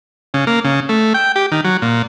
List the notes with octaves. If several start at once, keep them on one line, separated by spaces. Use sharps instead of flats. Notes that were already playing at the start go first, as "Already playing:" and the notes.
C#3
A#3
C#3
A3
G5
G4
D#3
F#3
A#2